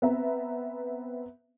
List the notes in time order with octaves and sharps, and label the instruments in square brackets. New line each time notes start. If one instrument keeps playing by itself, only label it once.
[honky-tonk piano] B3 C4 E5 A#5